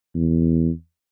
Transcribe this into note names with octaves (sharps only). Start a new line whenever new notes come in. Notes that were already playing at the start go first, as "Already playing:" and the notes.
E2